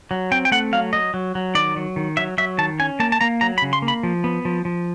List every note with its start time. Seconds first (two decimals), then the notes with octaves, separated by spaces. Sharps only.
0.11 F#3
0.32 C4 G5
0.45 G5
0.52 A3 F#5
0.73 F#3 F5
0.93 F#3 D#5
1.14 F#3
1.35 F#3
1.55 D#3 D5
1.76 F#3
1.96 D#3
2.17 F#3 E5
2.38 F#3 E5
2.58 D#3 A5
2.79 C#4 G#5
3.00 A#3 A5
3.12 A5
3.21 A#3 A#5
3.41 F#3 A#5
3.58 B5
3.62 C#3
3.73 C6
3.82 A#3
3.88 B5
4.03 F3
4.24 B3
4.45 F3
4.65 F3